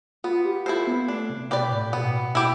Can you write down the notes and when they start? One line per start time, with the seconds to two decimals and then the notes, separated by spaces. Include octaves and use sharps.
0.24 B3 F4
0.45 G4
0.66 E4 F4 A4 C5
0.87 B3
1.08 A3 D4
1.30 C3
1.51 B2 G4 B4 D5
1.72 A2
1.93 B2 B3
2.35 E4 G4